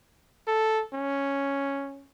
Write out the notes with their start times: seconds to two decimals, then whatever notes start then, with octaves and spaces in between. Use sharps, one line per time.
0.48 A4
0.94 C#4